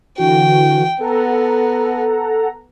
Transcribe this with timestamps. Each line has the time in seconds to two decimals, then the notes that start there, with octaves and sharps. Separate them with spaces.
0.18 D3 E3 F#4 G5
1.00 B3 A4 F#5 A#5